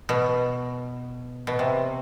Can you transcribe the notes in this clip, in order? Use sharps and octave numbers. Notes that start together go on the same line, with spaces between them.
B2
B2
C3